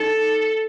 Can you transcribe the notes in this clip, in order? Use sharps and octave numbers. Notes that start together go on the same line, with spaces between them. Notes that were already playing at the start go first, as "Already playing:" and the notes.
Already playing: D#4 A4